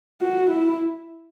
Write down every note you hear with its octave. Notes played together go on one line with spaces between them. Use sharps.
F#4
E4